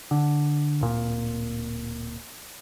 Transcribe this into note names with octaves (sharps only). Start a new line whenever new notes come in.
D3
D1 A#2